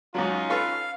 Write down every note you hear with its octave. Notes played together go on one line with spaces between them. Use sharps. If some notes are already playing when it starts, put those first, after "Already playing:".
G#2 F#3 C#4 D#4 F4
A4 B4 F5 C#6